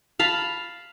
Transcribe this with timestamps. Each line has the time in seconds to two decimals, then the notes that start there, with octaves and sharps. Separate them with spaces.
0.19 F5 A5 B5